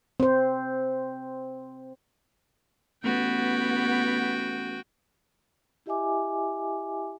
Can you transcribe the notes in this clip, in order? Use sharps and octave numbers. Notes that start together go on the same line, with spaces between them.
C4 C5
A1 B3 F#4 G5
E4 G4 D#5 E5 G#5 D6